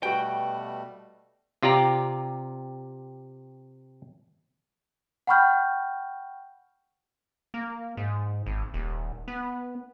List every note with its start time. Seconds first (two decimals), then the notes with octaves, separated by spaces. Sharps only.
0.03 B2 G3 A3 B3 F#4 G5
1.63 C3 F4 G4 D5 A#5
5.27 F#5 G5 B5 C#6 F6 G6
7.54 A#3
7.97 G#2
8.46 G#1
8.74 D#1
9.28 B3